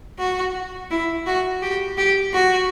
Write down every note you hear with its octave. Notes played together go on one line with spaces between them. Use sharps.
F#4
E4
F#4
G4
G4
F#4